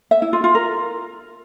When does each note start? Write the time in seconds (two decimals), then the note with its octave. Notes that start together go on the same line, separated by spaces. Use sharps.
0.11 E5
0.22 E4
0.33 F4
0.44 F4
0.55 A#4